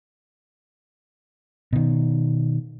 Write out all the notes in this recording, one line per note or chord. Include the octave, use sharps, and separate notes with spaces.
B2 D#3